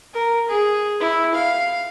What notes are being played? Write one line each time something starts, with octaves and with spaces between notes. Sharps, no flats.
A#4
G#4
E4
F5